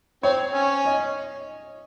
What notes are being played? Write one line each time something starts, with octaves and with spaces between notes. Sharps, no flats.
C4 C#5
C#4
D#5